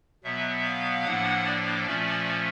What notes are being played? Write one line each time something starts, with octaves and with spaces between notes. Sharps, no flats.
B2 F#3 B3 E5
F5
A2 F3 A#3 D4 F#5
D5
A#2 F3 A3 C#4